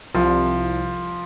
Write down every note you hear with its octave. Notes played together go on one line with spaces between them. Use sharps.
C2 F3